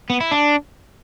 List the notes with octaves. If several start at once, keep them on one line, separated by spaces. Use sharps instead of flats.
B3
E4
D4